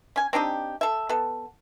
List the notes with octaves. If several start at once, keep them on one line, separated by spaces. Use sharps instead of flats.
C#4 G#5
C4 D4 D#4 G4
A4 E5
B3 A4